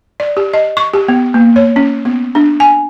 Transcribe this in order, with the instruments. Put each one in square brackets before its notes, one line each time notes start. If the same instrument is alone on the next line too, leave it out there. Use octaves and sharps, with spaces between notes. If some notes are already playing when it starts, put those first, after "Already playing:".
[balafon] D5
G4
D#5
C#6
G4
B3
A#3
C#5
C#4
B3
D4
G#5